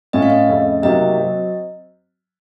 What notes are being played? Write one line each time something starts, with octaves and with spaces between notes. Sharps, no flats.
A2 A3 C#4 F4 D#5
F5
D#5
F2 C#3 A3
C3 F#3 A#3 D#4 F#4 D#5
F#3 C4 F#4